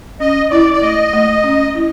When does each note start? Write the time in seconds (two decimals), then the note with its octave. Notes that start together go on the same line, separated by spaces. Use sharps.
0.20 C#4 D#5
0.50 E4 D5
0.73 D5
0.81 A3 D#5
1.13 A3
1.43 C#4
1.75 E4